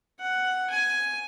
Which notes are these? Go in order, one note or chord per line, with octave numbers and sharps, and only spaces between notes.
F#5
G#5